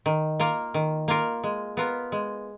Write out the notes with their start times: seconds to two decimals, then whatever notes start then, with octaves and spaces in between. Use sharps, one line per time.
0.06 D#3
0.40 A#3 F4 A#4
0.74 D#3
1.08 A#3 F4 A#4
1.43 G#3
1.77 B3 F4 A#4
2.12 G#3